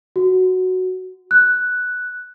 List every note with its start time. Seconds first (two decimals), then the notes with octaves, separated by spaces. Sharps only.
0.16 F#4
1.31 F#6